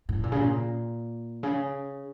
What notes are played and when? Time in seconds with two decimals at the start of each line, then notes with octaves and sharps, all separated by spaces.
0.09 A2
0.23 A#2
0.32 C#3
0.40 A#2
1.43 C#3